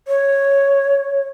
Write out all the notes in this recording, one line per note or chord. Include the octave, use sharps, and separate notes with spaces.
C#5